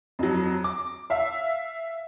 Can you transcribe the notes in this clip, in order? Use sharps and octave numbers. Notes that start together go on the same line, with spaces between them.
F2 F#3
D6
E5 F5